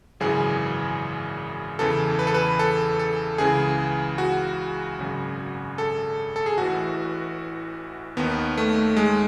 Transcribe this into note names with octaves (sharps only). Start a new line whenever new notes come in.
G#1 F#2 C#3 E3 G#4
E2 C#3 E3 A4
B4
A4
B4
A4
A4
C#2 C#3 E3 G#4
F#4
G#1 F#2 C#3
A4
A4
G#4
A1 A2 E3 F#4
D#2 D#3 B3
A3
G#3